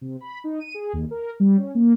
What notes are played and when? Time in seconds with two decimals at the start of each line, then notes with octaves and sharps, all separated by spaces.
0.01 C3
0.21 B5
0.44 D#4
0.60 D#7
0.74 G#4
0.93 D#2
1.11 A#4
1.40 G3
1.57 C#4
1.75 A#3